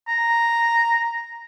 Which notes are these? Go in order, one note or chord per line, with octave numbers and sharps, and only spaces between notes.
A#5